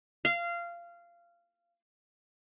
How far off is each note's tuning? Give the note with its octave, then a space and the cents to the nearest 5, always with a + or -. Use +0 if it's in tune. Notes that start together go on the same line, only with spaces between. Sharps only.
F5 -20